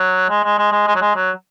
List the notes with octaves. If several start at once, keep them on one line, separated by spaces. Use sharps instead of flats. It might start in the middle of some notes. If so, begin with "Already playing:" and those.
Already playing: F#3
G#3
G#3
G#3
G#3
G#3
F#3
G#3
F#3